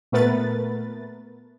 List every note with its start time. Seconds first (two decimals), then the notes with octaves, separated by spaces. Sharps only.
0.12 A#2 A3 B3 A#4 B4 A6